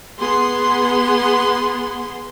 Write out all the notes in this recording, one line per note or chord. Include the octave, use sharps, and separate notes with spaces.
B3 G#4 C6